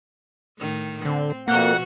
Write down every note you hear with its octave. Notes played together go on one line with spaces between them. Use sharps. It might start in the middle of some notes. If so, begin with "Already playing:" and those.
A2 D#3
D3 C4
F2 B2 F3 A#3 F#4 F#5